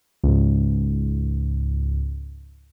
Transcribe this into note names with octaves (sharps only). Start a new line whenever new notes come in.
C#2 G#2